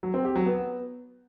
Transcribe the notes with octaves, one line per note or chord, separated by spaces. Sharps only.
F#3
C4
G4
F#3
B3